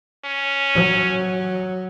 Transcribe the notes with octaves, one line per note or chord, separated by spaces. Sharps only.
C#4
F#3